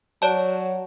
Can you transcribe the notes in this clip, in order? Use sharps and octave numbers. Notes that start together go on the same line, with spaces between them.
F#3 C#5 D5 A5